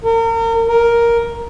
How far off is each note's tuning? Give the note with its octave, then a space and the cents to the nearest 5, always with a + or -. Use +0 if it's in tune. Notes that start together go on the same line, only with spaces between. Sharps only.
A#4 -35
A#4 +5